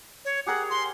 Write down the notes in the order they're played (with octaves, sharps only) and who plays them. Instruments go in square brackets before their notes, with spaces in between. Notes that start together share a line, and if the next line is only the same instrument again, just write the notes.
[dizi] C#5
[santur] G4 G#4 A#4 [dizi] F#5
[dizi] C6